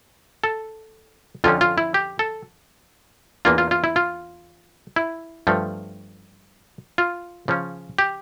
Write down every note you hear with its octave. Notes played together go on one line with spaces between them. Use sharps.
A4
F2 D3 F3 C#4 F4
F4
E4
G4
A4
E2 E3 A#3 D4 F4
F4
F4
E4
F4
E4
G2 F3 A3
F4
C#3 F3 C#4
G4